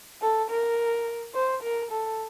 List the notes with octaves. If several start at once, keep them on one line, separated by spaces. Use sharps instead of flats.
A4
A#4
C5
A#4
A4